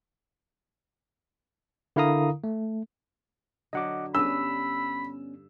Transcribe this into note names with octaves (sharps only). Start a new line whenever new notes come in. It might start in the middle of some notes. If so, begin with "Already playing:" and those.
D3 E4 A#4 F5 A#5 D#6
A3
D3 F#3 D#5 F#5 D6
G2 B3 C#4 B4 B5 E6